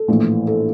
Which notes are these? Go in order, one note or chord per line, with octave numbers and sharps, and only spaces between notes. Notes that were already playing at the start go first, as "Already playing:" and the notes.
Already playing: A4
A#1 A2 E3 A3
A4